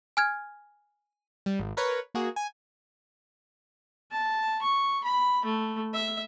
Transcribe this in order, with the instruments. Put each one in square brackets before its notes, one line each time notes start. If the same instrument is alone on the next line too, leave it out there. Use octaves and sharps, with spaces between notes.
[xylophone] G#5 F6 G#6
[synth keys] G3
G#1
A#4 B4 C#5
A#3 F#4 G#4
G#5
[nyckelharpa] A5
C#6
B5
A3
E5